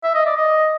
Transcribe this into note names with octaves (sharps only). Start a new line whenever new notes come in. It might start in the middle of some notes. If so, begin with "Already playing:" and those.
E5
D#5
D5
D#5